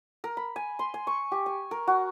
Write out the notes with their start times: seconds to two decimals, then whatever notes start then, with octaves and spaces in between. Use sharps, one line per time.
0.24 A#4
0.37 B5
0.56 G#5
0.79 C6
0.94 G#5
1.07 C#6
1.32 G4
1.46 G#5
1.71 A#4
1.87 F#4